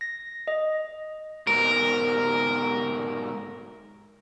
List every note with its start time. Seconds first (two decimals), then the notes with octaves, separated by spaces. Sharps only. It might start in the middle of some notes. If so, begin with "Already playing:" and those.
0.01 A#6
0.48 D#5
1.47 G#2 B2 A#4